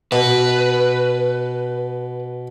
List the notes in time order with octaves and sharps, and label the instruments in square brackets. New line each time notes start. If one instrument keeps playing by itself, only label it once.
[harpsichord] B2 [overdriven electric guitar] B4